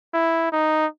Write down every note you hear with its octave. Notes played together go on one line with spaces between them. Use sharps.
E4
D#4